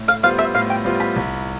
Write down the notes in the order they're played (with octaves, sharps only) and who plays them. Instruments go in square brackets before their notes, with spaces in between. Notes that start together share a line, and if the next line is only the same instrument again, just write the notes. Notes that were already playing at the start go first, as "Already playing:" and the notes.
Already playing: [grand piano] A2
[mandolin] F5
[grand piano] G3 B3 F4 C5 [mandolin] F5
[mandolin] E5
[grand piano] A2 [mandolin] F5
[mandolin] G5
[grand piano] G3 B3 F4 C5
[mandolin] B5
[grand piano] C2